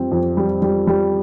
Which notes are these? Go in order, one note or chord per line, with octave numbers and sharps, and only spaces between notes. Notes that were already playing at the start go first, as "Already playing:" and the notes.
Already playing: F2 G3 C4
F2
G3
G3
G3